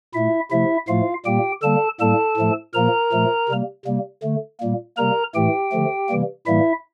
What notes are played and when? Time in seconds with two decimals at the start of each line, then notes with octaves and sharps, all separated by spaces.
0.14 A#2 A3 E4 E5
0.51 C3 F3 A3 E4 E5
0.88 A2 F3 A3 F4 F5
1.25 A#2 G3 A#3 G4 G5
1.62 D3 G3 A#3 A4 A5
2.00 A2 G3 A#3 A4 A5
2.37 A2 F3 A3
2.74 A#2 F3 A#3 A#4 A#5
3.12 A#2 F3 A3
3.49 C3 G3 A#3
3.85 C3 G3 A#3
4.23 D3 A3
4.60 A#2 G3 A#3
4.97 C3 G3 A#3 A#4 A#5
5.35 A2 E3 A3 G4 G5
5.72 D3 F3 A3
6.09 C3 E3 G3 A#3
6.47 A2 E3 G3 A#3 E4 E5